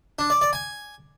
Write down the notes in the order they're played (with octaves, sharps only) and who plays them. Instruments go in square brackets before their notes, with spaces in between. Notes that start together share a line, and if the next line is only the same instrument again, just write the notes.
[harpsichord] D4
D5
D5
G#5